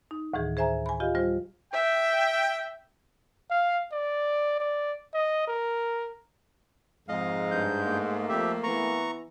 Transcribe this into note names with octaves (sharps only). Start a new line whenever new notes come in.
D#4
D2 A2 D#3 E3 G#4
G#4 C5 E5 G#5 A#5
G#5 B5
F4 G4 D#5 F5
G3 F4 C5
E5 G5
F5
D5
D5
D#5
A#4
F2 G#2 G#3 D#5 F5
G2 G6
A3 A#3
F2 G4 E5
E3 B3 A#5 C#6